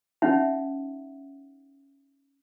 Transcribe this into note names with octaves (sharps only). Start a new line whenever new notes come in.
C#4 D#4 E5 F#5